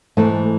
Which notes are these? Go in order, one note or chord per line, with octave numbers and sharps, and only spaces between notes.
G#2 E3 A3